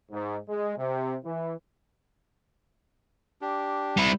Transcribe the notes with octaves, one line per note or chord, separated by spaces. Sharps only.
G#2
G#3
C3
E3
D4 G4
G3 E4